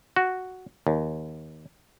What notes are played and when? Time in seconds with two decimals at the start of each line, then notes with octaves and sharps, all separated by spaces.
0.16 F#4
0.87 D#2